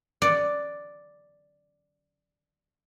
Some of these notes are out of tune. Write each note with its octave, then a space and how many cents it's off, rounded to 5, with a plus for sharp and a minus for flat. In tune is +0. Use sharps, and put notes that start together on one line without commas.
D5 +0 F#5 +0